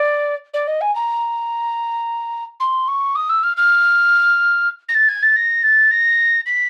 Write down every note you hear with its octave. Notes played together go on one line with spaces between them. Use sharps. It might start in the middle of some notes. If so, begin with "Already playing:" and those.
Already playing: D5
D5
D#5
G#5
A#5
C6
C#6
D#6
E6
F6
F6
A#6
A6
G#6
A6
A#6
A6
A#6
B6